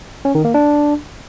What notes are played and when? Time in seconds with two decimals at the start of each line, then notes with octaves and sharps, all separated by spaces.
0.25 C#4
0.35 D#3
0.45 A#3
0.54 D4